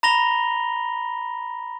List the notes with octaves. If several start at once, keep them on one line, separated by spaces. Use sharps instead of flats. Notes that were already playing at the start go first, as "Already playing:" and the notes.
A#5 B5 A#6 F7 G7